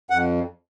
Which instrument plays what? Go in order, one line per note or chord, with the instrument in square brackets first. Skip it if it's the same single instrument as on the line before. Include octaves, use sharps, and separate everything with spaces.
[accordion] F2 F#5